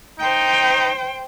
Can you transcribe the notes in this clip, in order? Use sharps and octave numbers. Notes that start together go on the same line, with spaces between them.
D#4 C5 G5